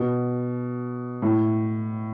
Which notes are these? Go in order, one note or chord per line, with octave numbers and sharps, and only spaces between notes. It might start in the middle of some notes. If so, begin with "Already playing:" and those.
Already playing: B2
A2